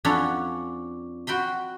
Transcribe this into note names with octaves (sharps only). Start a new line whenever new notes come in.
F2 C#4 D4 C#5 F#5 B5
F#4 G5 B5 C6